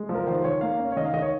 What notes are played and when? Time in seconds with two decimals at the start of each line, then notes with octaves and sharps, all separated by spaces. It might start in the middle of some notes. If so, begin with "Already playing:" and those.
Already playing: G#3
0.09 F3
0.14 A#4
0.27 D#3 C5
0.38 C5
0.44 D#3 C#5
0.61 A#3 F5
0.79 C#4
0.92 C#5
0.96 D#3 D#5
1.05 F5
1.13 D#3 D#5
1.22 C#5